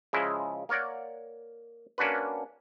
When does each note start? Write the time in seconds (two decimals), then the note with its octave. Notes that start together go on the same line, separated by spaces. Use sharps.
0.13 C#3 F3 G#3 E4
0.69 A#3 A#4 C#5 D5 F#5
1.98 A#3 C#4 D4 F#4 B4